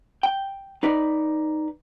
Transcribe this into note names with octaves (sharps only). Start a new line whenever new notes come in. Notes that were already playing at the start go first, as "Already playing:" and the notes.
G5
D#4 B4 D5